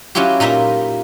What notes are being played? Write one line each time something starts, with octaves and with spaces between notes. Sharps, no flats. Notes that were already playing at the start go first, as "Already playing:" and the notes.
F#3 C#4 E4 F4 G4
A#2 D#4 F4 A#4 E5